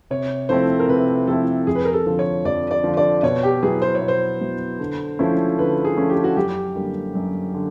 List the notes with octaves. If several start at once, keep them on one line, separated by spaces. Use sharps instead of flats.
C3 C#5
F3 A3 C4 E4 C5
A#4
C3 B4
F3 A3 C4 E4 A4
F2 G#4
B4
A#4
A4
D3 F3
C#5
F2 D5
D5
D3 F3
D5
B2 C#5
G4
F#3 B3 E4 G#4
C5
C#5
B2
C5
F#3 B3 E4
D3
F3 A3 C#4 E4
D3 B4
G#4
F3 A3 C#4 E4
G4
F#4
F#2 G4
D3 G3 A#3
F#2
D3